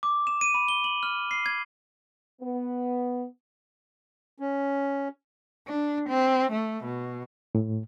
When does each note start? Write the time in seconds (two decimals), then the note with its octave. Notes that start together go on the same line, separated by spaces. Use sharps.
0.03 D6
0.27 E7
0.41 D#7
0.54 B5
0.68 G7
0.84 F#7
1.03 F6
1.31 C7
1.46 G#6
2.41 B3
4.39 C#4
5.67 D4
6.09 C4
6.52 A3
6.84 B2
7.55 A2